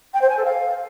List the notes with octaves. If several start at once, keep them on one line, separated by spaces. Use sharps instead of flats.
G5
C5
G#5
A4
F5